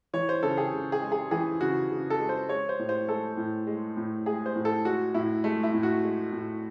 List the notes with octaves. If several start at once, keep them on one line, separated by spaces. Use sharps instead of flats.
E3 C#5
C5
C#3 A4
G#4
C#3
G#4
G#3
G#4
E3 G#4
C#3 F#4
C#3
A4
G#3
C5
G#3 C#5
C5
A2
C5
G#3 A4
A2
G#3
A2
G#3 G#4
C5
A2
A4
G#3 F#4
A2 E4
G#3 A3
E4
A2
F#4
G#3
A2